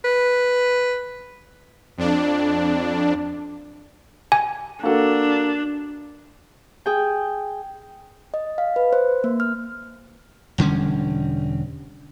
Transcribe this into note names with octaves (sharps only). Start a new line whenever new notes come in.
B4
F2 D4
G#5
A#3 D4 F#4 A4
G#4 G5
D#5
F5
B4
C5
A#3
F6
E1 D3 G3 C#4